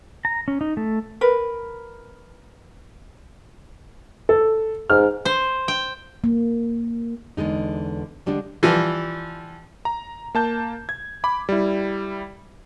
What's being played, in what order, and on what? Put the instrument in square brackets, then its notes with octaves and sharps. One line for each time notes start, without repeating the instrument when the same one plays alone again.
[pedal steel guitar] A#5
C#4
D#4
A3
[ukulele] A#4 B4
[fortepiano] A4
[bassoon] G#2 [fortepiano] F6
[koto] C5
G5
[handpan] A#3
[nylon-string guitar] E2 D3 G#3 D#4
D3 G3 G#3 D4
[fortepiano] E3 F3 G3
[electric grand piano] A#5
A#3 A5 G6
G#6
B5 D6
G3 E4